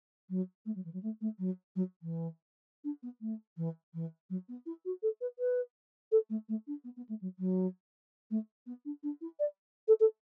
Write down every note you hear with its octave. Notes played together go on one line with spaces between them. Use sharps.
F#3
A3
F#3
E3
F#3
A3
A3
F#3
F#3
E3
D4
B3
A3
E3
E3
F#3
B3
E4
F#4
A4
B4
B4
A4
A3
A3
D4
B3
B3
A3
F#3
F#3
A3
B3
D4
D4
E4
D5
A4
A4